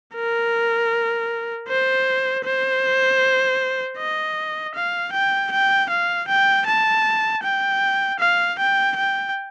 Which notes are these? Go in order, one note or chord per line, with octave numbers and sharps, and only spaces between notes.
A#4
C5
C5
D#5
F5
G5
G5
F5
G5
A5
G5
F5
G5
G5